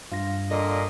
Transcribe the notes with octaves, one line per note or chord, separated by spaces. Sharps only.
G2 F4 A#6
A#2 D3 D#5